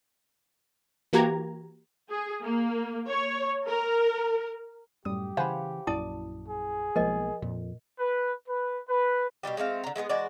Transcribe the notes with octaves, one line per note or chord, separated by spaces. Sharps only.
E3 A#3 F#4 G4 A#5 G#6
G#4
A#3
C#5
A#4
F#2 A2 G3 G4 D#6
C#3 E3 C5 F5 F#5 G#5 B5
A#1 F#2 E4 D5 A5 D#6
G#4
B1 F3 G#3 A#3 A#4 D#5
F2 A#2
B4
B4
B4
B2 E3 G3 G4
G#3 A3 C4 F5
D3 A#5
G#3 A3 B3 G#4
E3 G#3 F#4 D5